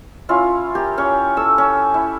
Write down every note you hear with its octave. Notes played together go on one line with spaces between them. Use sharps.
C#4 E4 F4
G4 A#4
C#4 C#5
A4 E6
C#4
E4